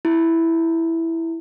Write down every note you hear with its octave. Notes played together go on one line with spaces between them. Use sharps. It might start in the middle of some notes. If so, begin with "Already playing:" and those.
E4